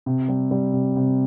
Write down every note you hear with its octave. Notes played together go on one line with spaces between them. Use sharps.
C3
G3
G3
C3
C3